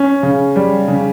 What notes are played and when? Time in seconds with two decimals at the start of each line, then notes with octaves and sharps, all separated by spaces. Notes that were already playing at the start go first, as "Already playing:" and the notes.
Already playing: C#4
0.23 C#3
0.56 G3
0.88 C#3